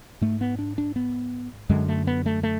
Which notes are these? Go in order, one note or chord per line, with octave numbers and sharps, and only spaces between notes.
G#2 A3
B3
D4
D4
B3
F#2 D3 G#3
A3
B3
A3
A3